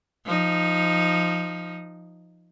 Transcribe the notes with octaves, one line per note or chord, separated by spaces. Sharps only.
F3 D#4